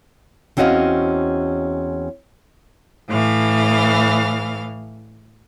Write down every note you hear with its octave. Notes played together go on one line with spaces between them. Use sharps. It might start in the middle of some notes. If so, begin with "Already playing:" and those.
E2 C4 C#4 F#4 D#5 F5
A2 E3 F5